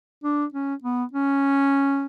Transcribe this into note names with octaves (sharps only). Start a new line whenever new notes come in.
D4
C#4
B3
C#4